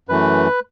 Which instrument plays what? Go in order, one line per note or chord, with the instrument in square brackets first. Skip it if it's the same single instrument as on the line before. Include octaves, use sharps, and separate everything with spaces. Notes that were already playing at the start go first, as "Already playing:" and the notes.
[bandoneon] F#2 E3 A3 B4